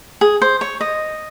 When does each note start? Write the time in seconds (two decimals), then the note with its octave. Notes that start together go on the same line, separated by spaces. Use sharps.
0.21 G#4
0.42 C5
0.61 C#5
0.81 D#5